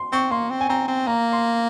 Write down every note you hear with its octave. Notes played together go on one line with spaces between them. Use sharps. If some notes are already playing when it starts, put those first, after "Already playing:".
Already playing: C6
C4 C#6
A#3 C6
C4
G#5
C4 A#5
C4
A#3 A#5
C6